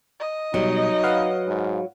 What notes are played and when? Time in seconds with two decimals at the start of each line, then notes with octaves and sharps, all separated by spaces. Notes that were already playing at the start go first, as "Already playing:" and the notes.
0.20 D#5
0.54 B2 F#3 G3 D#4
1.03 B4 F5 F#5
1.47 G#2